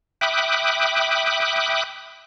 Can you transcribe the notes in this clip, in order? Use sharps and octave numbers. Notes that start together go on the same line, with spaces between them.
E5 G5 B5 D6 D#6 F#6